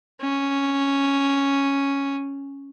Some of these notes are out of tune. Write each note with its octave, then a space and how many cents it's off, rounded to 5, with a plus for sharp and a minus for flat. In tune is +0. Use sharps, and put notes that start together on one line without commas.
C#4 +0